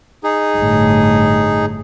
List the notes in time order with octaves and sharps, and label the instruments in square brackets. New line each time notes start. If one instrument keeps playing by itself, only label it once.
[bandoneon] D#4 G#4
[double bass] G1 A2